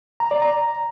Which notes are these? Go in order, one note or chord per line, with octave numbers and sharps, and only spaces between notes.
A#5
D5
A#5